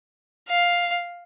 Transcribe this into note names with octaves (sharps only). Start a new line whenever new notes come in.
F5